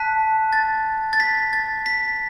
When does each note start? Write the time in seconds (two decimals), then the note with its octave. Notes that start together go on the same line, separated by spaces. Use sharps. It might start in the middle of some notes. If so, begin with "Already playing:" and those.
Already playing: A5 F#6 B6
0.53 A6
1.13 A6
1.20 B6
1.53 A6
1.86 B6